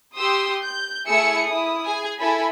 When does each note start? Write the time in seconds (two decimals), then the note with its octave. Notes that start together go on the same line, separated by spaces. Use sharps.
0.16 G4 C6 D#6 E6
0.62 G6
1.06 A3 E4 G#4 G#5 E6 C#7
1.45 E4 D#6
1.85 G#4 G#5
2.20 E4 A4 G#5 B5